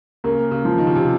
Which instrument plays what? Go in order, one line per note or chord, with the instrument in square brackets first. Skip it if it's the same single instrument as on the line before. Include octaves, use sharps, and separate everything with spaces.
[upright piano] C#3 [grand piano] A#3
[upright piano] C#3
[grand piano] F3
[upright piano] D#3
C#3
C3